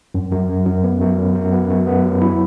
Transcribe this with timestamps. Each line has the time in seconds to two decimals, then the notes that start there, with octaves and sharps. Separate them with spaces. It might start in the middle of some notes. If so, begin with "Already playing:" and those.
0.15 F#2
0.32 F#2
0.49 F#2
0.66 F#2
0.84 B3
1.01 F#2
1.18 F#3
1.35 F#2
1.53 B3
1.70 F#2
1.87 B3
2.05 F#3
2.21 E4